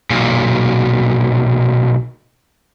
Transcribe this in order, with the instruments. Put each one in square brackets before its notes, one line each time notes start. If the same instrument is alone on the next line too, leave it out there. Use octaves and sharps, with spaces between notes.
[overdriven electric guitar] B1 A#2